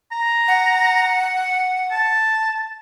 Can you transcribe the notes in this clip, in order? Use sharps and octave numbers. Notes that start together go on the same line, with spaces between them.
A#5
F#5
A5